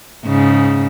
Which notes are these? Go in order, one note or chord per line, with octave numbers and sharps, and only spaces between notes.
G#2 C#3